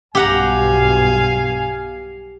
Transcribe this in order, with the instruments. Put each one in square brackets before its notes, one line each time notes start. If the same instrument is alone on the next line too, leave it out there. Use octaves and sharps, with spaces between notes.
[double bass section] B1 G2 B2 [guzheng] G4 F#5 A#5 [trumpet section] F5 G#5